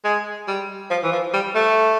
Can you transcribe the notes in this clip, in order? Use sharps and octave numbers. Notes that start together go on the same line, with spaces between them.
G#3
G3
F3
E3
F3
G3
A3